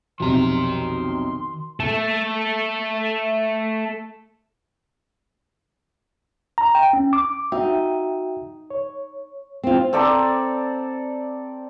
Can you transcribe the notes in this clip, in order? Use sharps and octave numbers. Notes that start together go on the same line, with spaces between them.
B1 F2 C3 D#3 A#5 C6
A3 A4
A#5
G5
C#4
D6
D#4 F#4 E5 G5
C#5
C4 F4
C4 A4 D5 A#5